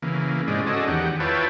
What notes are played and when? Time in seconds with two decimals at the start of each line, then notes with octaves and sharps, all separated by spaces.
0.02 C#3 E3 A#3
0.48 G#2 C3 G#3 C#4 D5
0.67 C#4 F#4 G#4 A4 D5 D#5
0.88 E2 D#3 G4 F#5
1.20 E4 F4 B4 C#5 G5 A5